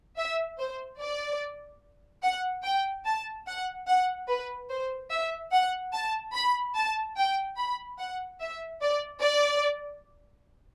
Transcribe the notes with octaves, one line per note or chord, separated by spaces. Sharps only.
E5
C5
D5
F#5
G5
A5
F#5
F#5
B4
C5
E5
F#5
A5
B5
A5
G5
B5
F#5
E5
D5
D5